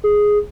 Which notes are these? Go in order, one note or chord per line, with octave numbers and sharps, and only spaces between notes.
G#4